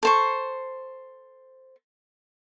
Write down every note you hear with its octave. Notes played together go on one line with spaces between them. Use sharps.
A4 C5 C#6